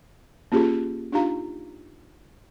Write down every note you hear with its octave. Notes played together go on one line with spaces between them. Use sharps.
A#3 C#4 F4 G4 G#4
D4 D#4 F4 G4 F5 A#5